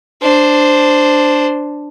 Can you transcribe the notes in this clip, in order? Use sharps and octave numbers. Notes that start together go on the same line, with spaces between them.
D4 C5